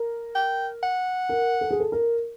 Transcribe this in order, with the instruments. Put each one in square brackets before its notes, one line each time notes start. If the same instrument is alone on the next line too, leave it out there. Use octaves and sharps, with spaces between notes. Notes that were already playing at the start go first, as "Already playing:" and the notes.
Already playing: [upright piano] A#4
[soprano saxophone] G5
F#5
[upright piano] A#4
A4
G#4
A4
A#4